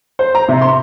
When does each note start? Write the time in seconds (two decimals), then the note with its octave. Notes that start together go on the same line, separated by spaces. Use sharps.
0.19 C5
0.35 A#5
0.49 C3
0.61 C6